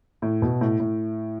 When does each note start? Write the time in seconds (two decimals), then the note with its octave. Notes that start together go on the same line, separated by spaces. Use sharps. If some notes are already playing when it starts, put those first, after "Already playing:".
0.22 A2
0.42 B2
0.61 A2
0.80 A2